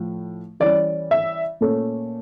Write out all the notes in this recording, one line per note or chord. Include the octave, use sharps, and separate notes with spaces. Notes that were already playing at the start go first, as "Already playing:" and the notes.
Already playing: A2 F3
E3 G3 C#4 D5
E5
A#2 A3 C#4